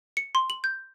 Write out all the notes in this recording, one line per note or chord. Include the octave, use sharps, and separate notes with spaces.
C#7
C6
F#7
G6